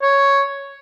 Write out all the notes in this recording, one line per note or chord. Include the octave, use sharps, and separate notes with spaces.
C#5